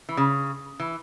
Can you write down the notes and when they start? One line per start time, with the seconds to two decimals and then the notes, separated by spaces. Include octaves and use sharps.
0.09 E3
0.17 C#3
0.80 E3